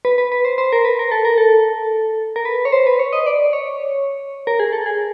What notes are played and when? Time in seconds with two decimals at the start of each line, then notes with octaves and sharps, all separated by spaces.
0.05 B4
0.18 B4
0.32 B4
0.45 C5
0.58 C5
0.73 A#4
0.85 B4
0.99 A#4
1.11 A4
1.25 A#4
1.38 A4
2.36 A#4
2.45 B4
2.65 C#5
2.72 C5
2.87 B4
2.99 C#5
3.13 D#5
3.26 D5
3.53 C#5
4.47 A#4
4.60 G#4
4.73 A4
4.86 G#4